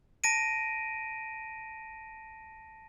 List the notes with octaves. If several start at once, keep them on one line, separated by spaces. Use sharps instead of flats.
A5 A#6 D7 D#7